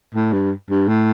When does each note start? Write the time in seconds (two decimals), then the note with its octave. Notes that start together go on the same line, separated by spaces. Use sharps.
0.14 A2
0.32 G2
0.70 G2
0.88 A2